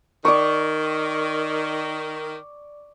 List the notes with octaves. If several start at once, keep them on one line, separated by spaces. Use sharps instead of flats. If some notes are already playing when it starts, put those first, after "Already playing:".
D#3 D5 C#6